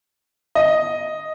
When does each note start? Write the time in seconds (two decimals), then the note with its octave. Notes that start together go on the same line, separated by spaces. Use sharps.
0.55 D#5